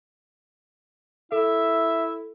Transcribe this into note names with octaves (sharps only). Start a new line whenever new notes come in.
E4 A4 E5